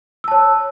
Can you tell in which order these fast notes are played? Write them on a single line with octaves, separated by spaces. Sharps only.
E6 A5 C#5